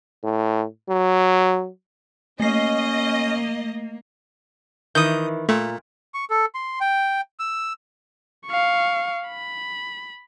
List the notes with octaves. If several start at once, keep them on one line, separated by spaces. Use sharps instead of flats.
A2
F#3
A3 A#3 C#4 D#5 C7
D#3 E3 D#6 G6
A#2 A3
C#6
A4
C6
G5
E6
F5 C#6
B5